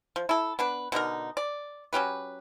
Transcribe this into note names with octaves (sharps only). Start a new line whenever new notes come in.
F3
E4 A4
B3 D4 B4
B2 D3 D#4 A#4
D5
F#3 C#4 G4 B4